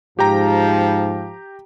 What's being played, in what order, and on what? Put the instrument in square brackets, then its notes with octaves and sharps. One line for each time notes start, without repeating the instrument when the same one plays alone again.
[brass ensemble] G#2 [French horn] F3 [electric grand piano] G4 G5 A#5